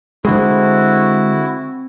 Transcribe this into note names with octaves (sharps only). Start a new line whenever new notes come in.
D3 G#3 C4 E4 F#4 F#5